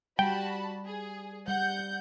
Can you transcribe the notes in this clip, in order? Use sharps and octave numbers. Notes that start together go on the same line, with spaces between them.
G3 F#4 G5 A5 B5
G#4
G3 F#5 G6